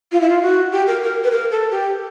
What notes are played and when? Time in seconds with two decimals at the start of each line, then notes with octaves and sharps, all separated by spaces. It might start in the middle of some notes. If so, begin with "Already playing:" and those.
0.12 F4
0.21 E4
0.29 F4
0.42 F#4
0.72 G4
0.87 A#4
1.02 A#4
1.24 B4
1.31 A#4
1.51 A4
1.71 G4